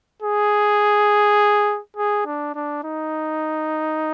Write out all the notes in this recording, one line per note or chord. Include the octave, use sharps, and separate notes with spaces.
G#4
G#4
D4
D4
D#4